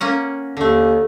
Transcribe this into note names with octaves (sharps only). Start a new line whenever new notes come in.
A#3 C#4 F#5
D#2 D3 A3